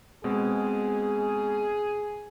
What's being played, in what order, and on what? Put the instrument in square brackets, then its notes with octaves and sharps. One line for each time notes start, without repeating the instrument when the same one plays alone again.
[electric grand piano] B2 G#3 C4 [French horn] G#4